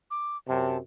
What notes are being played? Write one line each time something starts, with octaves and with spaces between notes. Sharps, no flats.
D6
F#2 C3 A5